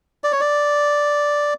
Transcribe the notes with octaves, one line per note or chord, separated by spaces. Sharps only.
D5
C#5
D5